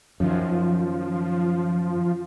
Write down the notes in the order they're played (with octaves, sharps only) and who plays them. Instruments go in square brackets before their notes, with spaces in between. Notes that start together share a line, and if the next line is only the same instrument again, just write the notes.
[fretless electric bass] F#2 D#3 [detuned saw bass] F3